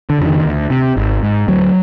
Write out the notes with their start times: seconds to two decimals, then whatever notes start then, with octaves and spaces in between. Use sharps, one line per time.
0.10 D3
0.19 F2 C#3
0.27 D#3
0.45 D2
0.70 C3
0.97 G#1
1.23 G#2
1.48 D2 F#3